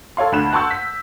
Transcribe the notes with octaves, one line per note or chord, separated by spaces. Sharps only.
A4 C#5 F5 C6
D2 B5 F#6 E7
F#5 A5 C6 C#6 E6 G6
B6